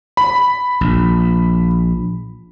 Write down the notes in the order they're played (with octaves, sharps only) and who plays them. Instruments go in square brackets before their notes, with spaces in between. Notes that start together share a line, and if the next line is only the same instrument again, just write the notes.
[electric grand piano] B5
[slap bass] A#1